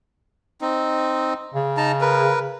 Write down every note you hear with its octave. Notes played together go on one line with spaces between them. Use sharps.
C4 D#4
C#3
D#4 A5 A#5
A#4 B4